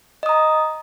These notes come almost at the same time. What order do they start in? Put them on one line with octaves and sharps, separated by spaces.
D#5 D#6 A#5